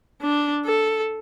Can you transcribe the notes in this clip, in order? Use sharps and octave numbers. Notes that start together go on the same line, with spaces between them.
D4
A4